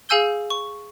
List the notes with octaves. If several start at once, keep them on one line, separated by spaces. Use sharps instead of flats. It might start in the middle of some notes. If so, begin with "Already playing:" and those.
G#4 F5 G#5 E6 G6 G7
C#6